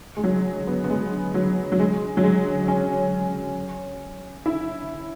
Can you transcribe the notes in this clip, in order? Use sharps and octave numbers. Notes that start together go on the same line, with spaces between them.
G#3
F#3
B3
B3
G#3
F#3
F#3
G#3
F#3
G#3
C#4
E4